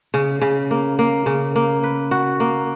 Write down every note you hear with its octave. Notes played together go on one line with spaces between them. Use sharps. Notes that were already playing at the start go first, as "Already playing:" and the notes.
C#3
C#3
A#3
A#3
C#3
A#3
B4
F#4
A#3